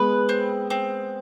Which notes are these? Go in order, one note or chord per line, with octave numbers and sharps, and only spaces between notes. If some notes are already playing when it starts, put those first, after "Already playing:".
Already playing: G#3 B3 B4
C4
C4